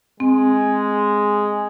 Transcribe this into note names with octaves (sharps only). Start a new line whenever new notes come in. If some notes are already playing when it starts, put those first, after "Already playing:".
G#3 C4